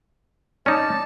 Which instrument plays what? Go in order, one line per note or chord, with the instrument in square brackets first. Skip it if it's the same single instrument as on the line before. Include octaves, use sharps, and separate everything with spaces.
[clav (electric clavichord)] C#4 D#4 [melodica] D5 A5